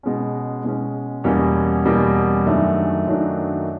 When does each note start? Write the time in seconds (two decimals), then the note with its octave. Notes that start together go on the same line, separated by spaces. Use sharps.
0.03 B2 G#3 C#4
0.64 B2 G#3 C#4
1.24 E2 B2 G3 A#3 C#4
1.85 E2 B2 G3 A#3 C#4
2.46 F#2 D#3 F#3 A3 D4
3.07 F#2 D#3 F#3 A3 D4